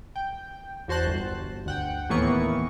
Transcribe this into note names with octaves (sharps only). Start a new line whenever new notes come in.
G5
E2 F#4 C5 A5 F#6
G1
D2 F#5 G5
D#2 A2 E3 A#3 B3 C#6